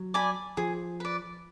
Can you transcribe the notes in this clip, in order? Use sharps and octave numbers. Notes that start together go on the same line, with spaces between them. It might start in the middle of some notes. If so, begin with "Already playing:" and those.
Already playing: F#3
D5 G#5 B5
F3 G#4
B4 D5